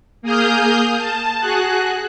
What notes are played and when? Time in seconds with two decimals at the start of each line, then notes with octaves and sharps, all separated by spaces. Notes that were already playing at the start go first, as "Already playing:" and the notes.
0.22 A#3 G#4 D#6 F6 G6
0.98 A5
1.40 F#4 G#4 F#6